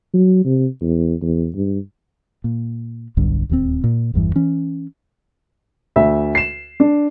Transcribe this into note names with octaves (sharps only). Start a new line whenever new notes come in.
F#3
C3
E2
E2
G2
A#2
D#1 B1 G2 D3
D1 D#2 F3 C4
A#2
G1 E2 G2 E3
E3 C#4
D2 E5
C7 E7
D4